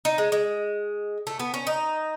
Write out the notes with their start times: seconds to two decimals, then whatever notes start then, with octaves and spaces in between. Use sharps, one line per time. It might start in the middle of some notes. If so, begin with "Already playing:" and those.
0.05 D#4
0.18 G#3
0.32 G#3
1.27 A3
1.40 B3
1.54 C#4
1.67 D#4